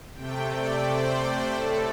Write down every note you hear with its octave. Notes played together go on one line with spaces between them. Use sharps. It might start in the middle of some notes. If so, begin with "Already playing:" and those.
C3 A3 G5
D5
C5
C5
A2 A3 A4